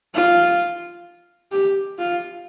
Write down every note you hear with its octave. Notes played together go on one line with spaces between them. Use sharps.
F4
G4
F4